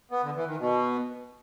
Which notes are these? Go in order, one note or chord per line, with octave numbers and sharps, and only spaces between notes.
B3
D3
E3
D#3
B2